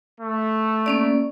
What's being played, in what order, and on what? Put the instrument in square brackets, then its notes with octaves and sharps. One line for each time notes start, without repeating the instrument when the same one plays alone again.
[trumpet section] A3
[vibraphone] A#3 C#4 D5